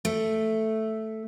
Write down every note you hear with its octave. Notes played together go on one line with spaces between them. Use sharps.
A3